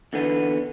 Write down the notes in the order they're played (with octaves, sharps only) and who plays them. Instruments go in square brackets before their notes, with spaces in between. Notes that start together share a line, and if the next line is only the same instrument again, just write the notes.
[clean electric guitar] E2 D3 B3